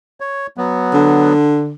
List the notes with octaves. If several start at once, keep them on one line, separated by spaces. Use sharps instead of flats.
C#5
F#3 B3
D3